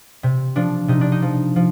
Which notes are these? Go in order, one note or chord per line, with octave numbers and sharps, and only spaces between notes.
C3
F3 D4
C3 D#4
D4
D#4
F3
F3